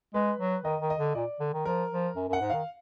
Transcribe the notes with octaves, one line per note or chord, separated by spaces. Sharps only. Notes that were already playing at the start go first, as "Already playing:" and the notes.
G#3 B4
F#3
D#3 D#5
D#3
D#5
D3
A#2 D5
D3
D#3
F3 A#4
F3
F#2
F#2
F#5
G#2
D#3 F5